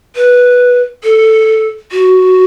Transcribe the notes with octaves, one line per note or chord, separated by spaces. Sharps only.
B4
A4
F#4